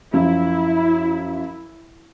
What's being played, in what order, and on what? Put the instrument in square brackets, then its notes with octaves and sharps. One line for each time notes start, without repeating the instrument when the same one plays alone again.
[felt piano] F#2 F3 [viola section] E4